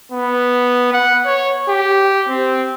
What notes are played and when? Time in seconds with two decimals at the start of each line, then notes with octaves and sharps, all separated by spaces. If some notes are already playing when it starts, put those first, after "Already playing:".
0.12 B3
0.93 F#5
1.26 C#5
1.68 G4
2.28 C4